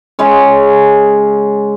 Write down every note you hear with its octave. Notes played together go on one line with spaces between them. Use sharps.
C#3 G#3 C#5